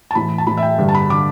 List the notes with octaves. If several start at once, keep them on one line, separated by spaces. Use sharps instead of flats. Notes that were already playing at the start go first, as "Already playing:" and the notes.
A5
A2 E3 B5
A5
A2 E3 B5
E5
G5
G2 D3
A5
B5
D3 D6